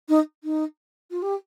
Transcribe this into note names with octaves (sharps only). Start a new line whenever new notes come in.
D#4
D#4
F4
G4